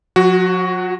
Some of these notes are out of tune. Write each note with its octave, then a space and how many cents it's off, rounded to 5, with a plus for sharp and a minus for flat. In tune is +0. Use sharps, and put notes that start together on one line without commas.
F#3 -45 F#4 +10